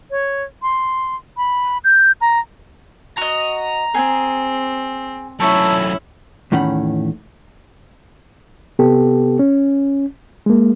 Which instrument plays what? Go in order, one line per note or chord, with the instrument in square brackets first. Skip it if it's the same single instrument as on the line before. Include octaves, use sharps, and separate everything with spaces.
[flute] C#5
C6
B5
G6
A#5
[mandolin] F#4 D#5 [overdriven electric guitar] A#5
[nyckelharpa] C4 [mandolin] G#4
[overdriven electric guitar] F#2 A3 [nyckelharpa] C#4 E4 [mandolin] A4 C#6
[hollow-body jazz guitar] E2 A2 D#3 C#4 F#5 B5
[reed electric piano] C3 B3 G4 A4
C#4
G#3 A#3